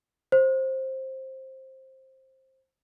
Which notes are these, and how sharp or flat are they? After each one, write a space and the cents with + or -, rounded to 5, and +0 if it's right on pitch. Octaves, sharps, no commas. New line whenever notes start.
C5 +15